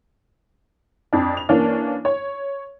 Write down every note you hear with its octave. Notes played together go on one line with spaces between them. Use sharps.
F2 D4
F7
E3 A#3 C#4 D4
C#5